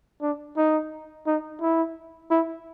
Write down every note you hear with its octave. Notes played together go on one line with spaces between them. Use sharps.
D4
D#4
D#4
E4
E4